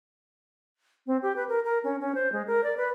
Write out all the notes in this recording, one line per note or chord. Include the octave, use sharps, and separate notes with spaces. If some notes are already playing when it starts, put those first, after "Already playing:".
C4
G4
B4
A#4
A#4
C#4
C#4
C5
G#3
A#4
D5
B4